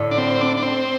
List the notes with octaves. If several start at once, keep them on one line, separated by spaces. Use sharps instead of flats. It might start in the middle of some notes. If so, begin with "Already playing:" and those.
Already playing: A2 D3
D4
C4
D4
D4
C4